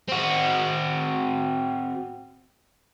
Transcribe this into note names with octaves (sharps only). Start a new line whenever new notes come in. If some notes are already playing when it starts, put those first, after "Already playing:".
C4 F#4